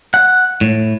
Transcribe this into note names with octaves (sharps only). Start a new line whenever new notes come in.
F#5
A2